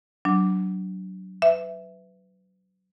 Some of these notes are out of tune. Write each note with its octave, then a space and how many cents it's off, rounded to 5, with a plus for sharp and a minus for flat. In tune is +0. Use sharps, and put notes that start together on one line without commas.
F#3 +20 D4 +0
B4 +25 E5 +5